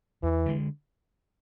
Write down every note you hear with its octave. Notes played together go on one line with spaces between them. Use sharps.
E2 E3
D3 G#3